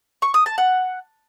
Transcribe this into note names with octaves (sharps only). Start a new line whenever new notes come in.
C#6
D#6
A5
F#5